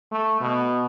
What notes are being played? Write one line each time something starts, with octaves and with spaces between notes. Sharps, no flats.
A3
B2